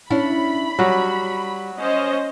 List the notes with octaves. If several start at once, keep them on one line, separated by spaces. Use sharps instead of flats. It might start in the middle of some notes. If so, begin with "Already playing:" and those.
C#4 D4 E4 B5
F#3 G3 F#4
C#4 C5 D#5